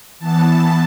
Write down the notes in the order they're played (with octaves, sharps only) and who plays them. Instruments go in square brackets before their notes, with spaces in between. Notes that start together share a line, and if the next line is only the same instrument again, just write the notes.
[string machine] E3 B3 A5